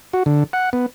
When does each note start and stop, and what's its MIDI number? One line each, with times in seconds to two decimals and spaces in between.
0.13 0.23 66
0.26 0.44 50
0.53 0.70 78
0.73 0.86 59